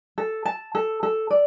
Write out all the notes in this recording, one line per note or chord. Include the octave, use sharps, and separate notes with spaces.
A4
A5
A4
A4
D5